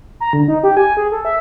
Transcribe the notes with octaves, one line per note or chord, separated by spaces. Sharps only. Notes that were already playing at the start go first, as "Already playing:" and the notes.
A#5
D3
D#4
G4
G#5
G#4
A4
E5